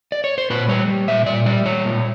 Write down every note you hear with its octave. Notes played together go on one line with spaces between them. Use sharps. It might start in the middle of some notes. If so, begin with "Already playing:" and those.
D5
C#5
C5
A#2 B4
G3 C#5
G3
A#2 E5
A#2 D5
G3 D5
G3 C#5
A#2